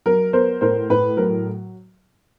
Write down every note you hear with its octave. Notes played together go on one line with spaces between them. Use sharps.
F#3 A#4
B3 A#4 C5
A2 A#4 C5
A2 B4
F#3 A#4